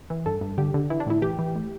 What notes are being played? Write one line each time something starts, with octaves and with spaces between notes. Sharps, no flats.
E3
G2 A4
G2
D3 G4
D3
E3 E4
D4
A2 E4
E3 G4
E3
A2